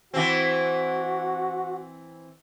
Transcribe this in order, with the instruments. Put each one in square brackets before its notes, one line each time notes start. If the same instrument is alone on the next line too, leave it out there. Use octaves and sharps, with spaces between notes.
[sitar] E3 C4 [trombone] F#4